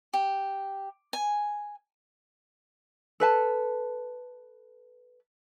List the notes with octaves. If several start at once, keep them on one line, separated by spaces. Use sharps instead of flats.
G4
G#5
A4 B4 A5